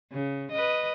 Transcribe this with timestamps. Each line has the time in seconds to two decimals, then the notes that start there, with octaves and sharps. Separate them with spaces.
0.12 C#3
0.52 B4 D#5